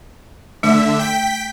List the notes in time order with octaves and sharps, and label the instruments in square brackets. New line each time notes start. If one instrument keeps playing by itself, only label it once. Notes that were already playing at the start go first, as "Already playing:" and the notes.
[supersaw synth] D3 E5 [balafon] A3
[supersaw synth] G5 B6